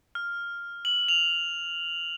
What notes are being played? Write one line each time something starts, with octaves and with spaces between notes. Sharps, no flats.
F6
F#7
F7